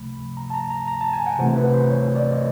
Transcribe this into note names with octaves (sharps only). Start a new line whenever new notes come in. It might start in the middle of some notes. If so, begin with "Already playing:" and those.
Already playing: C#2 C3 F3 A3 B5
A#5
A5
A#5
A#5
A#5
A5
G#5
F#5
C3 E3 A3 C4 C5
B4
C5
C#5
D5
D#5